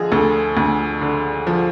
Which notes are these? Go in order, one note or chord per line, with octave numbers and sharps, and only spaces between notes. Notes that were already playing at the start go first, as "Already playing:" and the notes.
Already playing: D3 F3 G#4 D#5
D2 A4
D2
D3
F3